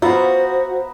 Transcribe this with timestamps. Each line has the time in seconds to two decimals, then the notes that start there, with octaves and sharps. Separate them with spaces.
0.02 B3 F4 F#4 C5 E5 A#5